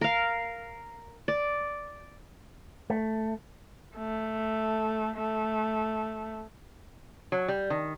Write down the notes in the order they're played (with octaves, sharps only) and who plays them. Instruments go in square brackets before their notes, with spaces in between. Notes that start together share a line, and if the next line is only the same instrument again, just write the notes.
[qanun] A#4 F5
D5
[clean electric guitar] A3
[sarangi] A3
A3
[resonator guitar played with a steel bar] F#3
G3
D#3